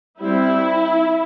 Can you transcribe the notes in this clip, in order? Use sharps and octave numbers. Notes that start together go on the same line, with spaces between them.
G3 C4 E4